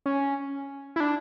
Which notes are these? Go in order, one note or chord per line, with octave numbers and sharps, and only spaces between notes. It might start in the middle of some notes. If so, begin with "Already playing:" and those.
C#4
E4
D4